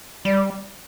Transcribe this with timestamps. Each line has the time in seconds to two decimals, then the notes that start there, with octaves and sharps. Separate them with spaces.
0.25 G3 D5